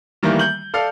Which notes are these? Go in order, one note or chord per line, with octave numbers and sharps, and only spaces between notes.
D#3 E3 G3 A3 A#3
G6 F#7
A4 D5 F5 F6